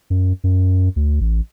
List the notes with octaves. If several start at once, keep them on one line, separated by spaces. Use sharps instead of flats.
F#2
F#2
D2
A1